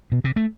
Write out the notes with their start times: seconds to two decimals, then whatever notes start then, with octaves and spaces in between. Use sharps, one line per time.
0.12 B2
0.24 C3
0.36 A3